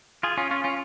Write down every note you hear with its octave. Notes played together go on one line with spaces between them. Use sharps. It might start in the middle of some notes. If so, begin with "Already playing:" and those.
F4 G#4
C#4 F4
C#4 F4
C#4 F4